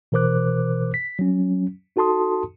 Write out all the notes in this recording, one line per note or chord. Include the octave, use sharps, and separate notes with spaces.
B2 E3 A#4 C5 D6 F#6
B6
F#3 C#4
D#4 F#4 A4 A5 C6 D#6